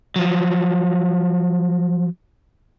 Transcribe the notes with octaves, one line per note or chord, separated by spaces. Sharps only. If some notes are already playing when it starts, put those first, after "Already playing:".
F3 F#3